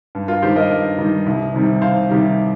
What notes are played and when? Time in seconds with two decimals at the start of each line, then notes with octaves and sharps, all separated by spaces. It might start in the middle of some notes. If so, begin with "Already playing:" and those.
0.15 G2
0.28 F4 A#4
0.42 D#3 G3 G4 C5
0.56 A#4 D#5
0.70 G2
0.98 D#3 G3
1.26 C2
1.54 C3 D#3 G3
1.81 C2 C5 F5
2.10 C3 D#3 G3 G4